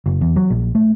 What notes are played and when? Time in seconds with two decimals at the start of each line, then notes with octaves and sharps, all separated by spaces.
0.06 F#1
0.21 E2
0.36 F#3
0.50 A#1
0.75 A3